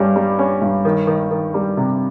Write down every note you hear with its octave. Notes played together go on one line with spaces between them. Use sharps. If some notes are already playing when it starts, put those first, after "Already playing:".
Already playing: G2 G3 C#4
G3
C#4
G2
D#3
D#3
D#3
G3
C3